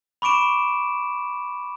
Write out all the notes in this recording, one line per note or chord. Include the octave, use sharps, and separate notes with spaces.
B5 C#6 D6 D7 E7